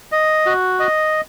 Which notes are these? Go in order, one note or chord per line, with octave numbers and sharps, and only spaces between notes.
D#5
F#4
D#5